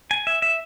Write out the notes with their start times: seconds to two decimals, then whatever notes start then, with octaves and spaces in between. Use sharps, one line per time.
0.11 G#5
0.27 E5
0.42 E5